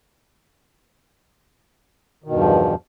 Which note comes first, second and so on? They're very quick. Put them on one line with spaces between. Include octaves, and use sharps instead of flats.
D#3 B2 G2 E2 F3